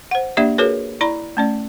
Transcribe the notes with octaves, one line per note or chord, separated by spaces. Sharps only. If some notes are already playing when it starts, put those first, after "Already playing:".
C5 F#5
A#3 D4 G4 D5 E5
F#4 G#4 A#4 B4 C#5
E4 D5 A#5 B5
A3 C#4 D5